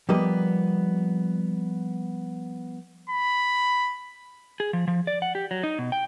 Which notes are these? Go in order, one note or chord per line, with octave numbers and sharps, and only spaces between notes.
F3 G3 A#3 B3 G4 D#5
B5
G#4
F3
F3
D5
F#5
G4
F#3
D#4
B2
G5